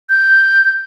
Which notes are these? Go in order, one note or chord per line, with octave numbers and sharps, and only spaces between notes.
G6